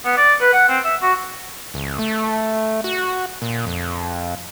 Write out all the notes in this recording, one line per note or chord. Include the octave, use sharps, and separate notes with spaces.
B3
D5
B4
F#5
C4
E5
F#4
C#2
A3
F#4
A#2
F2